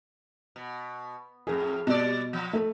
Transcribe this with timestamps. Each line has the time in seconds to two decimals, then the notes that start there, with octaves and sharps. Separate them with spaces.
0.56 B2
1.47 F2 A2 G#4
1.87 B2 G3 D5
2.33 F3
2.53 A3